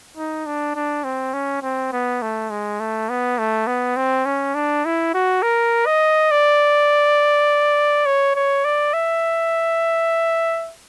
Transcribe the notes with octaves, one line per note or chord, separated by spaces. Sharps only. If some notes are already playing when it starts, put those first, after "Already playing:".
D#4
D4
D4
C4
C#4
C4
B3
A3
G#3
A3
B3
A3
B3
C4
C#4
D4
E4
F#4
A#4
D#5
D5
C#5
C#5
D5
E5